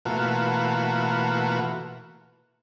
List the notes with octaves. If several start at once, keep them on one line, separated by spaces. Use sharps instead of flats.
B2 E3 A3 A#3 F4 F#4